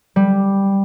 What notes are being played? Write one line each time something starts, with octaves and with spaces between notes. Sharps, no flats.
G3